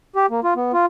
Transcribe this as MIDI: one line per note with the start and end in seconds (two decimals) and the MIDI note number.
0.16 0.26 67
0.30 0.40 58
0.44 0.54 65
0.56 0.72 59
0.73 0.86 65